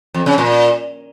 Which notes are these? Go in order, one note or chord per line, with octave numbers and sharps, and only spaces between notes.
F2
C#3
A#2